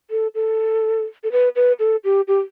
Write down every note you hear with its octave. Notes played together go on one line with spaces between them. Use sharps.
A4
A4
A4
B4
B4
A4
G4
G4